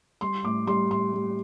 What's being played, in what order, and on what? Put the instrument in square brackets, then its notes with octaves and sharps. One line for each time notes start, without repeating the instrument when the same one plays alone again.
[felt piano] G3 C6
A2 D6
G3 C6
A2 C6
G3